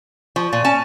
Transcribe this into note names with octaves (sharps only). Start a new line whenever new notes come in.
F3 C#6
A#2 A6 D#7
C#4 A5